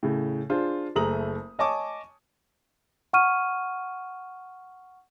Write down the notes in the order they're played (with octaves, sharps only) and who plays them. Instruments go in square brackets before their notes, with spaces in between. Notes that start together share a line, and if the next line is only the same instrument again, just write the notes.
[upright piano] A2 C#3
D4 F4 G#4 C5
F#1 A3 G#4 A#5 D#6 F#7
C#5 D#5 G#5 A5 C#6 D6
[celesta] F#5 C#6 F6 D#7